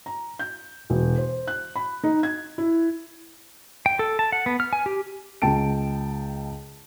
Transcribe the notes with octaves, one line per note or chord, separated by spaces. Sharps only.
A#5
G6
E1
C5
F#6
B5
D#4
G#6
E4
G5
A4
A5
F#5
B3
F6
G#5
G4
C#2 G5 A5 D7